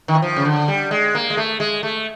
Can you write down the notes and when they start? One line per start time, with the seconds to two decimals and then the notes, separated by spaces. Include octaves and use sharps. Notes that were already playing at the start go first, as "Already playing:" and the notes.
0.08 D#3
0.15 E3
0.22 F3
0.36 C#3
0.45 D3
0.68 G3
0.91 G#3
1.15 A#3
1.30 G#3
1.37 A3
1.60 G#3
1.83 A3